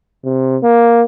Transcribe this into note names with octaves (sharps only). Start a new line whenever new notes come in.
C3
A#3